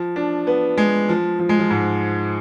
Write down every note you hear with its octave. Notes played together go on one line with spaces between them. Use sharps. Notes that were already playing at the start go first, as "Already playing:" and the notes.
Already playing: F3
D4
B3
G#3
F3
F3
G#3
F3
G#2